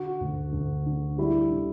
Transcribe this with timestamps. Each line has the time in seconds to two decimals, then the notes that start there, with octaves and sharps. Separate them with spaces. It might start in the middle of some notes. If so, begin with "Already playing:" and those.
Already playing: D3 F#4
0.21 D2
0.53 D2
0.86 D3
1.18 G3 E4
1.51 D3